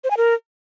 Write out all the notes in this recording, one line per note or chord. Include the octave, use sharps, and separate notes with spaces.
C5
G#5
A#4